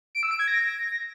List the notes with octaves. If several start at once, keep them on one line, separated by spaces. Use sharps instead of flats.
D7
E6
D7
G#6
A#6